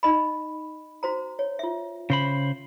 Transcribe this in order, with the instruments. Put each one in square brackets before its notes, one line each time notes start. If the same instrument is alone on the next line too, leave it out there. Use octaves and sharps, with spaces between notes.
[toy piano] D#4 D#5 B5
F#4 C5 A#5
C#5
F4 E5
[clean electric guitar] C#3 C5 B5